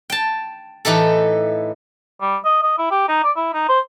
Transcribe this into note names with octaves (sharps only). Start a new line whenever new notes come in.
G5 A5
A2 E3 D#4 G4 A4
G3
D#5
D#5
E4
G4
D#4
D5
E4
D#4
C5